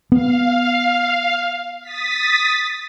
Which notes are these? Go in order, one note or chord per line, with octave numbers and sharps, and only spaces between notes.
B3 F5
D#6 A6 B6